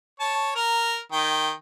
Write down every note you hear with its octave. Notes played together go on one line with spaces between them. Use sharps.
C#5 A5
A#4
D#3 G5